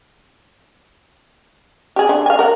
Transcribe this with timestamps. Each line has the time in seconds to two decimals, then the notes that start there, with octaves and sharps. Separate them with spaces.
1.96 G4 G#4
2.09 D3
2.26 F5 G#5
2.39 A#4 F#5